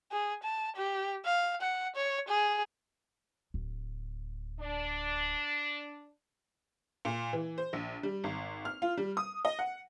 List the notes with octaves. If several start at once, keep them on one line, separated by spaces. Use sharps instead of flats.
G#4
A5
G4
F5
F#5
C#5
G#4
D1
D4
A#2
E3
C5
A#1
G3
G#1
F6
F4
G3
D#6
D#5
F#5